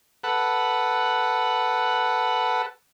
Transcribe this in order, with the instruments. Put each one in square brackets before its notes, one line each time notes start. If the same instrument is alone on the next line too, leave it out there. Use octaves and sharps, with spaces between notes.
[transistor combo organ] A4 B4 F#5